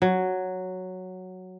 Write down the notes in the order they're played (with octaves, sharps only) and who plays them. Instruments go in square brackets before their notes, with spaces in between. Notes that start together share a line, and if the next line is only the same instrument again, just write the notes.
[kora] F#3